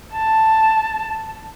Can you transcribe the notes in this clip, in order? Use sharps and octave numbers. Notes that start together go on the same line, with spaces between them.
A5